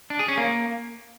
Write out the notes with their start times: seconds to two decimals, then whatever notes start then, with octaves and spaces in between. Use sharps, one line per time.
0.10 D4
0.19 G#4
0.28 C#4
0.37 A#3